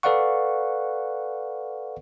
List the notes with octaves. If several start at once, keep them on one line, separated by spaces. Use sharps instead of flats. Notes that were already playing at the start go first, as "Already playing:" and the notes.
A4 B4 D5 F5 F#5 C#6